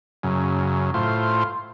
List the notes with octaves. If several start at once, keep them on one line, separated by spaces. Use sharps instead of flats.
F#2 C#3
A2 F4 C5